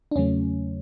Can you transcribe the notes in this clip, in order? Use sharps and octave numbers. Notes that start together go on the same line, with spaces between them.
D4
E2 C#3 F#3 A3 C#4